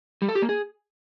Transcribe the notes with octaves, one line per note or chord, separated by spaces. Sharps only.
G3
A4
G4
A#3
G#4